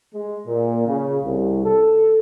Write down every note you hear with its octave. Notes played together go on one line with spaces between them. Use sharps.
G#3
A#2
C#3
C2
A4